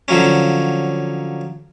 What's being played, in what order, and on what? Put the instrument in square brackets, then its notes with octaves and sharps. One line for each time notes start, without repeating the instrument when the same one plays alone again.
[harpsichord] D3 F3 F#3 A#3 C#4